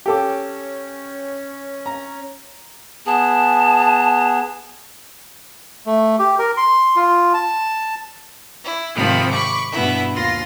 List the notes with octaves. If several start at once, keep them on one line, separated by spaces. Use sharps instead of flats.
C#4 G4 A4 D6
A#5
B3 G#4 A5
A3
G4
A#4
C6
F4
A5
E4
G#2 C3 D#3 F3 C4 B5
B5 C#6 D6
G2 B2 B3 E4
D#2 F4 C6 A#6